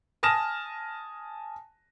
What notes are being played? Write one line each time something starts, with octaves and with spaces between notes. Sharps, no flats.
G#5 A5 D#6 F6 A#6 E7